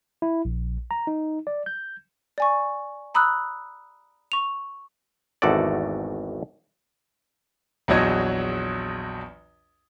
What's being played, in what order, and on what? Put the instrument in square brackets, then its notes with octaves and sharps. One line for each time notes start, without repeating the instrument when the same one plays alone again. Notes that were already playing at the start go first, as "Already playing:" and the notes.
[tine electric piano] E4
A#1
A#5
D#4
D5
G6
[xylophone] D5 G#5 C#6
A#5 B5 D#6 E6 F#6
C#6 F7
[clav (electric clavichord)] G#1 E2 A3 F#4 A4 D5
[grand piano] A#1 E2 F#3 C#5 D#5 G#6